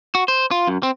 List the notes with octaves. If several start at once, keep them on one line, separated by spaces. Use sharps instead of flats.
F#4
C5
F4
F#2
C4